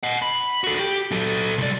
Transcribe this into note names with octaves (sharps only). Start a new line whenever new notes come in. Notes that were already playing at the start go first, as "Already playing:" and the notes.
D#5 F#5
B5
F#4 A4
G4
F#3 A4
C2 D5